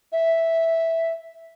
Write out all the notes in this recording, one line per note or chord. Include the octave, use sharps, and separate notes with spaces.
E5